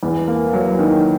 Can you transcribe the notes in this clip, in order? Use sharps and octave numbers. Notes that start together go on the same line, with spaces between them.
E2
A#3
F#3
D#3